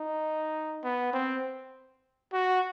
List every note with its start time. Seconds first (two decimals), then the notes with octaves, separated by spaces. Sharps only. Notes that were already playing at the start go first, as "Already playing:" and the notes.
Already playing: D#4
0.83 B3
1.13 C4
2.33 F#4